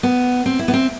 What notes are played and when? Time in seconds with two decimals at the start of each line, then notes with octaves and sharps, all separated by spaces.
0.03 B3
0.46 C4
0.59 E4
0.68 B3
0.74 C4